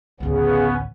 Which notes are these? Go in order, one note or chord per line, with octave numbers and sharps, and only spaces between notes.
A1 D2 C#3 B3 C#4